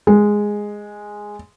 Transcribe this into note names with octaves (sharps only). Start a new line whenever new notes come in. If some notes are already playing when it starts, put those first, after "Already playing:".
G#3